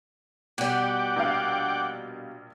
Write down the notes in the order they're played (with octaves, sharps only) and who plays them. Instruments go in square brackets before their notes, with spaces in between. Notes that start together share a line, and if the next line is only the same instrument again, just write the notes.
[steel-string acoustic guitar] B2 G3 [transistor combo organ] F#5 G5 D6
[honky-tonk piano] A#1 F5